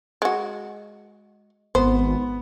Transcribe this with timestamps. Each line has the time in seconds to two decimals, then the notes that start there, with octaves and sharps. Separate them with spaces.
0.22 G#3 F#4
1.75 G#1 B3 C5